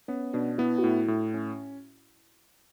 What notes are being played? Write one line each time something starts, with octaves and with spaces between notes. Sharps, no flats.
B3 C#4
B2 D4
B3 E4
F#4
A2 E4
A2
C#4